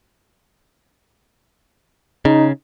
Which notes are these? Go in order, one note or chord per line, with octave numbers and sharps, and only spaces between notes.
C#3 D#4